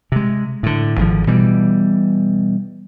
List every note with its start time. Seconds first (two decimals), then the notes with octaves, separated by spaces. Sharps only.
0.12 C3 G#3
0.63 A2 D3
0.97 G#1 D3 F3
1.27 B2 E3 G3